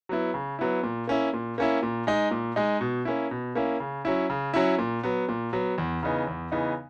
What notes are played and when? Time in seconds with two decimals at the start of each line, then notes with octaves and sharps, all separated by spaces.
0.09 F#3 B3 E4
0.34 C#3
0.59 F#3 B3 E4
0.83 A#2
1.08 A#3 C#4 E4
1.33 A#2
1.58 A#3 C#4 E4
1.83 A#2
2.07 G#3 D#4
2.31 A#2
2.56 G#3 D#4
2.81 B2
3.05 A#3 C#4 E4
3.31 B2
3.55 A#3 C#4 E4
3.80 C#3
4.05 F#3 C#4 E4
4.30 C#3
4.54 F#3 C#4 E4
4.78 A#2
5.03 F#3 B3
5.29 A#2
5.53 F#3 B3
5.78 E2
6.03 C#3 E3 B3 D#4
6.27 E2
6.52 C#3 E3 B3 D#4